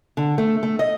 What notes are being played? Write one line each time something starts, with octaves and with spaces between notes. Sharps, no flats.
D3
A3
A3
D#5